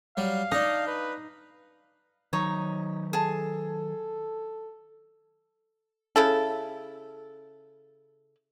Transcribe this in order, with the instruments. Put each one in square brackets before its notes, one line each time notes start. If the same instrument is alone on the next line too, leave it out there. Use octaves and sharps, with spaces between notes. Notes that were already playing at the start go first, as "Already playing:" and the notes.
[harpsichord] F#3 G3 [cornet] F5
[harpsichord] D4 D#5 [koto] D#4
[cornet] B4
[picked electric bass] D#3 F#3 [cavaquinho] D#4 C#5 A#5
[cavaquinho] G#4 A5 [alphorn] A4
[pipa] C#3 E4 A4